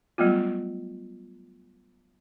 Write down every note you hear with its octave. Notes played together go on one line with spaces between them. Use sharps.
F#3 G3 A3 B3 F4